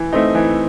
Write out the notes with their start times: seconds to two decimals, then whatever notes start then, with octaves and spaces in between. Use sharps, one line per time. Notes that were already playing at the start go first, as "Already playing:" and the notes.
Already playing: E3
0.13 A3 C4 D#4
0.35 E3